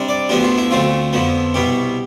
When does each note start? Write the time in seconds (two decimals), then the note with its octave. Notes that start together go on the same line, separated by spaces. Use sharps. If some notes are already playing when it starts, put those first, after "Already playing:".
Already playing: C3 G3 D4
0.08 D5
0.29 D2 D3 F3 B3 D4 G4
0.43 F4
0.57 E4
0.71 D2 D3 A3 C4 F4
1.13 F2 D3 F3 B3
1.54 C2 B2 B3 G4